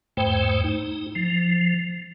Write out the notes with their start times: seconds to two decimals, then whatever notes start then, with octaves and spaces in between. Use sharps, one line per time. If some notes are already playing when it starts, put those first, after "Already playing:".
0.17 E2 G#2 A3 C5 G5
0.64 D#4
1.15 F3